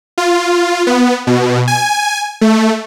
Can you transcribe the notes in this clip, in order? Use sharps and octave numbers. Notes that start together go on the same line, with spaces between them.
F4
B3
B2
G#5
A3